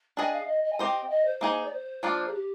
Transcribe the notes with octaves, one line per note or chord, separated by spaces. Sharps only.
D4 G#4 D#5 G5
F5
D#5
D#5
G#5
C4 G4 C5 D#5 G5
D#5
C5
A#3 D#4 G#4
D5
C5
F3 A#3 D4 F4
G#4
G4